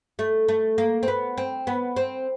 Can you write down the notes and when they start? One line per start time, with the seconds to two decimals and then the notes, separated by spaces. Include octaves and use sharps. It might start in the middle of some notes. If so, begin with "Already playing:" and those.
0.19 A3
0.49 A3
0.78 A#3
1.03 C4
1.08 B3
1.38 C4
1.67 B3
1.97 C4